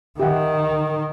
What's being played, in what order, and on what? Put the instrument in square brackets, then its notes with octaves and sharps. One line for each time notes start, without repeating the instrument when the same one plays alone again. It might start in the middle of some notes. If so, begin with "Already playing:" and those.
[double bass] D#3 [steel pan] G4 E5 F#5